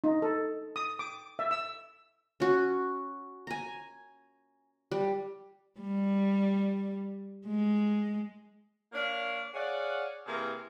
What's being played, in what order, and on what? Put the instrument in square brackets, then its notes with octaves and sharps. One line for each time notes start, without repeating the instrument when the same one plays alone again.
[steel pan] D#4
A4
D#6
D6
E5
E6
[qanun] C#4 F#4
G#5 A#5
G3
[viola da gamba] G3
G#3
[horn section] A#3 D4 C#5 F5
G#4 C#5 D5 F5 F#5
C3 E3 A#3 E4 G#4 A#4